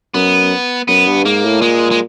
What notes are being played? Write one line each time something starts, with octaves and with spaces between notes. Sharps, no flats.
F#2 B3
F#2 B3
G2
G#2 A#3
A2
A#2 G#3
G#3